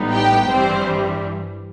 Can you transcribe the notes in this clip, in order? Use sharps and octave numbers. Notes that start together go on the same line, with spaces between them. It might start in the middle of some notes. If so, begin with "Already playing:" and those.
Already playing: A1 A2 G3 B3 D#4
G4 G5
G2 E3 G3 C4 C5